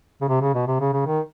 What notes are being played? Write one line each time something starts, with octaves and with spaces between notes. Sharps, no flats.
C#3
C3
C#3
B2
C3
C#3
C#3
D#3